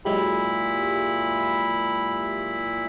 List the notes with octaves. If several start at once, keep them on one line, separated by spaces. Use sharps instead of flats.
A#2 F#3 G#3 E4 G4 B5